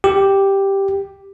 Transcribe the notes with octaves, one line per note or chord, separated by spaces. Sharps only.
G4